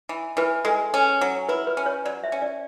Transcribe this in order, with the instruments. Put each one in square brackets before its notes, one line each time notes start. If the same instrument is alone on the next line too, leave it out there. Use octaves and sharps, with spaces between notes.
[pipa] E3
[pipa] E3 [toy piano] B4
[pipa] G#3 [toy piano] A4
[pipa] C#4
F#3
[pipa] E4 [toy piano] B4
[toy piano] B4
[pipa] C#4
[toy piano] C#5
[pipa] F#3 [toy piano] D5
[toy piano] E5
[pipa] C#4
[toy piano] D5